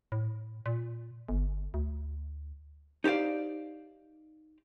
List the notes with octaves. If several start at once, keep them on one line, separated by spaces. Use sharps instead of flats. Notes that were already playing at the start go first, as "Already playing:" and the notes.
A2
A#2
G1
D2
D#4 G4 C5 D5 F5